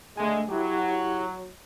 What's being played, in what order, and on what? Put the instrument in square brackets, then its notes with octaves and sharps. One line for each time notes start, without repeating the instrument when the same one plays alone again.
[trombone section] D3 G#3 [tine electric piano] A3 G#5
[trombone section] F#3 [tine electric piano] E4 G4